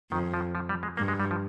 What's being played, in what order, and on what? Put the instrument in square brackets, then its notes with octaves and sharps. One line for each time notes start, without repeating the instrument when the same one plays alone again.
[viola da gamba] F2 [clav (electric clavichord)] D#3
[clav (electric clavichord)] F3
F3
G3
G#3
[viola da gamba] G2 [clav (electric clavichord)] A#3
[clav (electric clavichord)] G#3
G3
F3